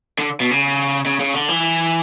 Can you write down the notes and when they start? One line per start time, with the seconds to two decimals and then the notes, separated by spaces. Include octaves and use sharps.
0.19 D3
0.40 B2
0.51 C#3
1.06 C#3
1.20 C#3
1.34 D3
1.48 E3